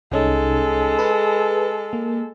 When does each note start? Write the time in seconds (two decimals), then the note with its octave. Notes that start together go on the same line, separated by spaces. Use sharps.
0.11 C2 G#3 C#4 D#4 A4
0.99 G#4 B4
1.93 A#3